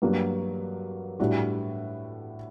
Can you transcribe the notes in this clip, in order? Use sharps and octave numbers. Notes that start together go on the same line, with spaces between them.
G2 F#3 A#3 F#4
A2 G3 D4 F#4